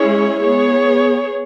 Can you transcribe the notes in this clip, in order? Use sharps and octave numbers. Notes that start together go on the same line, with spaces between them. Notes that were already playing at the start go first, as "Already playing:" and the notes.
Already playing: G#3 C#4 E4 G#4 C#5
B3 G#4 C#5